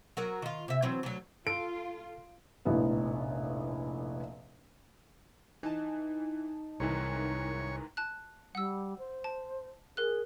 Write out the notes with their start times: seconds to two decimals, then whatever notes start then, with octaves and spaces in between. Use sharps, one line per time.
0.17 F#3 F#4 A#4
0.42 D#3 F4
0.68 C3 E5
0.82 E3 F#3 C4
1.03 D2 F#3
1.47 F4 A4 D7
2.65 F1 A#1 A2 B3
5.63 E3 D#4 A5
6.80 C2 G#2 D#3 E3 C#5
7.97 A5 F#6
8.55 G3 F#5 E6
8.99 C5
9.24 A5
9.97 G#4 A#4 F#6